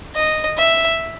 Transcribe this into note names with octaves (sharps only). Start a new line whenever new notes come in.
D#5
E5